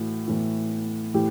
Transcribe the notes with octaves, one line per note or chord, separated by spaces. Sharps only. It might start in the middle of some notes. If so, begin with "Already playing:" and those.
Already playing: A2 E3 F#4
A2 E3
A2 E3 G4